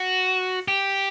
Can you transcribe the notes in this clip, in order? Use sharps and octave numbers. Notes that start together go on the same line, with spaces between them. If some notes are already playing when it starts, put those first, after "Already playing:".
Already playing: F#4
G4